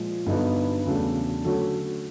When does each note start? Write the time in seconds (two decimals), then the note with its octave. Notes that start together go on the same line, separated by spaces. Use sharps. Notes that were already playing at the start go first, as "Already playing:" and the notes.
Already playing: A#2 F3 G#3
0.26 G2 D3 F#3 B3 D#4
0.85 E2 C#3 F#3 A3 D4
1.44 D3 F#3 A3 C#4 F#4